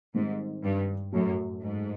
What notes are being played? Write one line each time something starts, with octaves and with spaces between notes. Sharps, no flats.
G#2 D#3 G3 C4
G2
F#2 A2 F#3 A3
G#2